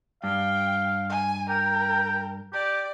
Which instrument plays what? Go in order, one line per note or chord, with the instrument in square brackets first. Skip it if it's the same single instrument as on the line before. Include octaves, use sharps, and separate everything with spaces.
[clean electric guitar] G2 [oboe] F5 [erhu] G5
[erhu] G#5
[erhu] A#4 [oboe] G5
[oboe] G4 [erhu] D5